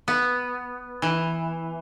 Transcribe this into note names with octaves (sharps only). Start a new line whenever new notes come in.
B3
E3